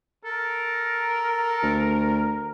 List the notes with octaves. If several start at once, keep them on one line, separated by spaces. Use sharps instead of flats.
A4 A#4
D2